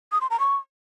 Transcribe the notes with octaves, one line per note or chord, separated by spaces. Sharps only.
D#6
C6
A#5
C#6